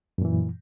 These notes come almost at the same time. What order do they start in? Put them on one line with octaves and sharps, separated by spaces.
F#2 A#2 E3